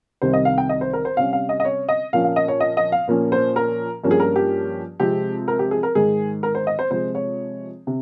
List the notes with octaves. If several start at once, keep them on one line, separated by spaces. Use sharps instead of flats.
C2 C3 D#3 G3 C5
D#5
F5
G5
D#5
C5
A#4
C5
C3 G3 C#4 F5
F5
D#5
D#5
C#5
D#5
A#2 F3 A#3 C#4 F5
F5
D#5
C#5
D#5
D#5
F5
A#2 F3 A#3 C#4
C5
A#4
G2 F3 A#3 C#4
G#4
A#4
G4
C3 F3 G#3 C4 G4
A#4
G4
G#4
A#4
G#2 D#3 G#3 G#4
A#4
C5
D#5
C5
C3 F3 G#3 C5
C#5
C3